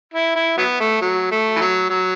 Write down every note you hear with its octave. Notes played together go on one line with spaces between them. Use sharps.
E4
E4
F#3 B3
A3
F#3
A3
E3
F#3
F#3